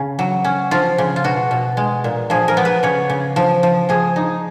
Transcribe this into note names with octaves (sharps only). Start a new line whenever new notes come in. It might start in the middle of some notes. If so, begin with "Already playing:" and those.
Already playing: C#3
F#3
C#4
F3 F4
C#3
F4
B2 F#4
B2
G#3
A#2
F3 G#4
A#4
B3
B4
C#3 C#5
C#3
F3
F3
F3 G#4
D#4